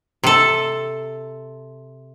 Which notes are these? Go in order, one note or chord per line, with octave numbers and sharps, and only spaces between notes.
C3 A4